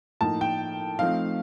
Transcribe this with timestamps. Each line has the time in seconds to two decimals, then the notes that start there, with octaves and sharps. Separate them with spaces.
0.21 A2 F3 A#3 D#4 A5
0.41 G5
0.99 F3 A3 C4 D#4 F5